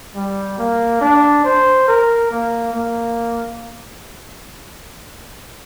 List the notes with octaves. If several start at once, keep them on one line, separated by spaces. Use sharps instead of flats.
G3
A#3
D4
C5
A#4
A#3
A#3